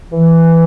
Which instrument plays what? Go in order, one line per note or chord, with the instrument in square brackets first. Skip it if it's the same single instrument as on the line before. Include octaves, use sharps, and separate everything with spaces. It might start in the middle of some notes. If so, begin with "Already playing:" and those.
[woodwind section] E3